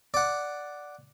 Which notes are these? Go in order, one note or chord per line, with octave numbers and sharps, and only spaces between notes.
D5 F#5